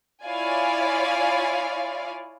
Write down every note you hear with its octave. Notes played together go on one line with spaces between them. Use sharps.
E4 F4 C#5 D5 F5 G#5